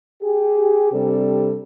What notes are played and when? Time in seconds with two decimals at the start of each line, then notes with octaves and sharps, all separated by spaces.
0.22 G4 G#4
0.93 C3 G3 C4 D4 A4